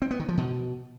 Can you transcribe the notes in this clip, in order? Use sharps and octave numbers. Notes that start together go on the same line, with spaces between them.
C4
B3
D#3
F3
B2